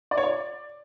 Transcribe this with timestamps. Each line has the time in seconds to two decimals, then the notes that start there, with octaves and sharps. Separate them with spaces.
0.11 D5
0.18 C#5
0.24 D5